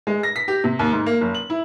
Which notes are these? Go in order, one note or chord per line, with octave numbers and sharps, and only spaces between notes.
G#3
A#6
B6
G4
C3
D#2
G#2
A#3
F#1
F#7
E4